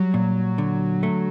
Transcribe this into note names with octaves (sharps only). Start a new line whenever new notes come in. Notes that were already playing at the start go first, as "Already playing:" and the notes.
Already playing: F#3 G3
A#2
D3
A3